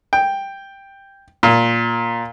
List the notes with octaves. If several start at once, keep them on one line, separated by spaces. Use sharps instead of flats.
G5
A#2